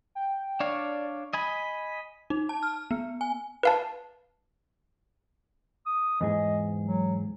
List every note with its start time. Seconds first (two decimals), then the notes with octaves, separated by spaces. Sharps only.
0.15 G5
0.60 D4 C#5 D5 F5
1.33 D#5 G#5 B5 B6
2.30 D#4
2.49 A5
2.63 F6
2.91 B3
3.21 G#5
3.63 B4 F5 A5
5.86 D#6
6.21 E2 G#2 G#4 D#5
6.83 F#3